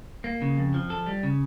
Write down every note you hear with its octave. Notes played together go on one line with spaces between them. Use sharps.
A#3
C#3
F2
F3
A4
G3
C#3